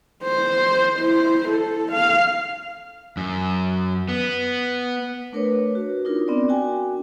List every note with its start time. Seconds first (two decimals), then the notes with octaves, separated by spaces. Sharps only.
0.24 C5
0.99 E4 C5
1.49 A4
1.92 F5
3.17 F#2
4.09 B3
5.32 A3 D4 A#4 B4 C#5
5.75 F#4
6.05 D4 D#4 F4 A#4
6.28 B3 C4 D4 A#4 D5
6.49 D4 F#4 G5 G#5